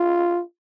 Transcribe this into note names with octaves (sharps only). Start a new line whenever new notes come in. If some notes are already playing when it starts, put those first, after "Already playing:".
Already playing: F4